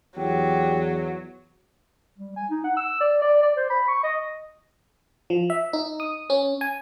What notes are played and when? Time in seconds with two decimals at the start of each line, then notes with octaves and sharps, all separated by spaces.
0.17 E2 F#3 G4
2.18 G3
2.36 G#5
2.51 D#4
2.64 F#5
2.77 E6
3.00 D5
3.22 D5
3.43 D5
3.57 C5
3.70 B5
3.88 C#6
4.03 D#5
5.30 F3
5.50 E5
5.73 D#4
6.00 D#6
6.30 C#4
6.61 G#5